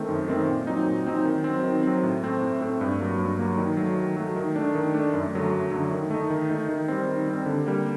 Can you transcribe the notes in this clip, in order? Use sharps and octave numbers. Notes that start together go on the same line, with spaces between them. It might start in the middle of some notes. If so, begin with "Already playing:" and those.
Already playing: D#3 A3 C4
F#2
D#3 A3 C4
A#2
F#3 C4 D#4
A#2
F#3 C4 D#4
D#3
F#3 C4
D#3
F#3 C4
A2
A3 C4
A2
A3 C4
G2
F#3 A#3
G2
F#3 A#3
D#3
F#3 A3
D#3
F#3 A3
D#3
A3 D4
D#3
A3 D4
F#2
D3 F#3 A3
F#2
D3 F#3 A3
D#3
A3 D#4
D#3
A3 D#4
D#3
G3 C4
D#3
G3 C4
D3
G3 A#3